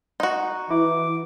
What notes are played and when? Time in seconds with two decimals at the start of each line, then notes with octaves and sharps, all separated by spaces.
0.20 D#4 F#4
0.71 E3 E4 D6